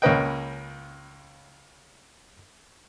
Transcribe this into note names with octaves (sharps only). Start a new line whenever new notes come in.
C#2 A#3 C#4 B4 D#5 G5